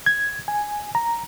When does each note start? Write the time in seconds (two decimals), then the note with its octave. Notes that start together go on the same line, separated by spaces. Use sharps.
0.06 G#6
0.48 G#5
0.95 A#5